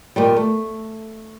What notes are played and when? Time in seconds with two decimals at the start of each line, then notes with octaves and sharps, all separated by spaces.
0.16 A#2 D#3 G3
0.37 A3